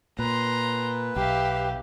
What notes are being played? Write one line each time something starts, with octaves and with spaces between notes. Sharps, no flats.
A#2 B4 A#5 C6
B1 G4 E5 F5